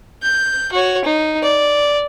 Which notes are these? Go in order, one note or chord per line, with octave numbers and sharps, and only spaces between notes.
G6
F#4 C#5
D#4
D5